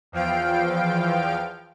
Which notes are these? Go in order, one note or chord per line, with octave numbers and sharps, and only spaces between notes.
E2 F3 F5 G5 D7